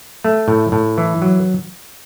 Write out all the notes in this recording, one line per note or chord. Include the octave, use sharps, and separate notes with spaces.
A3
A2
A2
E3
F#3